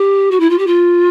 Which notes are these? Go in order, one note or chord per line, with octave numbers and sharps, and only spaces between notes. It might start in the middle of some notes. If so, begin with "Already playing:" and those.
Already playing: G4
F#4
E4
F4
G4
F4